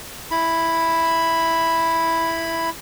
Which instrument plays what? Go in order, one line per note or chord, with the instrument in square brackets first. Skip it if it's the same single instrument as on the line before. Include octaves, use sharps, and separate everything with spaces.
[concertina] E4 B5